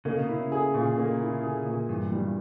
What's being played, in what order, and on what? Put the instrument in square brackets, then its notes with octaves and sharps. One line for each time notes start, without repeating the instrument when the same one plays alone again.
[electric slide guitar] C#3 [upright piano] A#3
[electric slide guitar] B2
[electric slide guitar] C#3 [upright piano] E4
[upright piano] G#4
A#2
A#3
E4
G#4
A#2
[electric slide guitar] G2 [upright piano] E3
[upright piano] G3